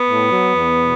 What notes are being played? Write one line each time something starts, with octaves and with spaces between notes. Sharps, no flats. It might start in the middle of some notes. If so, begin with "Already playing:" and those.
Already playing: B3
A2
F#3
E2
B2